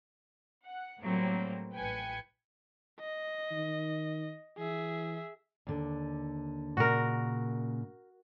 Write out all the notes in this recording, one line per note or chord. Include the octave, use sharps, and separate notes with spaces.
F#5
A2 F#3 G3 A#3 C4
A1 B4 G5 G#5 G#6 C#7
D#5
D#3
E3 G#4 E5
D#2 D3
A#2 C#3 F#4 A#4